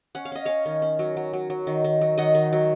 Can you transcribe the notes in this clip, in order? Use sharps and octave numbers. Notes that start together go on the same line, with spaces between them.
C#4 F#5
F5
C#4 D#5
C#4 C#5 F5
D#3
C#4
F#3
F#3
F#3
F#3
D#3
D#3
F#3
D#3 D#5 F#5
D#3
F#3